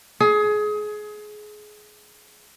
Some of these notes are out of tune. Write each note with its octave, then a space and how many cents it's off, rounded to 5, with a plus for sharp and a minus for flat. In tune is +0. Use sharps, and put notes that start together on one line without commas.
G#4 +25